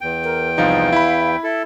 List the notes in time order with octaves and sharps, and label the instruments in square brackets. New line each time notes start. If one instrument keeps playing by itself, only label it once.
[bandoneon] E2 G5
[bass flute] A#4
[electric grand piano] C2 F3 D#4 [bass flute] F5
[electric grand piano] E4 B5
[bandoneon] E4 A4